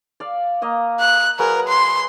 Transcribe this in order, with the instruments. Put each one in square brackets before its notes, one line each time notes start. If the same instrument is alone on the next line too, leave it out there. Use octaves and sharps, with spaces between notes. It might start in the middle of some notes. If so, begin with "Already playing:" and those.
[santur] D5 F5
A#3 D#5 F5
[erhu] F#6
[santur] F#3 G#4 B4 [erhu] A#4
[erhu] C6